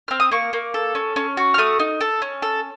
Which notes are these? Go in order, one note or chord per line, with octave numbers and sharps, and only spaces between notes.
C4 F6
D#6
A#3 C#6
A#3
A4
C#4
C#4
F#4
F6
A3 D#6
D#4
A4
C#4
A4